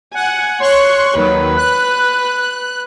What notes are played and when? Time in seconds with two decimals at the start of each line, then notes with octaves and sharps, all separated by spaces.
0.14 F#5 G#5
0.60 C#5 C6 C#6 F#6
1.15 D#2 D#3 F#3 B4
1.57 F#6